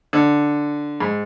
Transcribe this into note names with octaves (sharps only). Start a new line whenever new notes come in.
D3
G#2